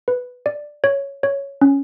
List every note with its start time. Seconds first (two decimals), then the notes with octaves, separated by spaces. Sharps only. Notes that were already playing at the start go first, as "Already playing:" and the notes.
0.08 B4
0.46 D5
0.84 C#5
1.23 C#5
1.61 C#4